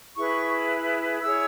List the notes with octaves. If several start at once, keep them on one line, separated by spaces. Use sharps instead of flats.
E4 G#4 B4 C#6
E4 G#4 C#5 E6